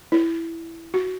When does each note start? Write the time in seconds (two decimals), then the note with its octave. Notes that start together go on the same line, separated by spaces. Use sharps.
0.12 E4
0.94 F#4